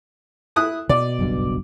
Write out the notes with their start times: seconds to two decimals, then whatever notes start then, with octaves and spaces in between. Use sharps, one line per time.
0.56 E4 D#6 F#6
0.89 B2 D5
1.19 F#1 B1 G2